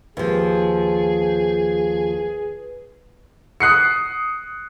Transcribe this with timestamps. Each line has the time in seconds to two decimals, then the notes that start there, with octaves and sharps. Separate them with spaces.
0.17 D#2 F3 G#4 B4
3.60 D#6 F#6 C7 C#7